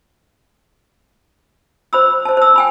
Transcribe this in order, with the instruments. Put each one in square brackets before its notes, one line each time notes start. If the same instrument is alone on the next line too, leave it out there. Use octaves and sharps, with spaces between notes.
[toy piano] C5 B5 E6
C5 A5
C5 E6
G5 G#5 B5